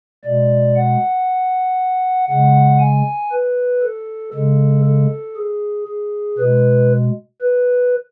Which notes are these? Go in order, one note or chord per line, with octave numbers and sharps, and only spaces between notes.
B2 G#3 D5
F#5
C#3 G#3 F#5
G#5
B4
A4
C#3 G#3 A4
A4
G#4
G#4
B2 G#3 B4
B4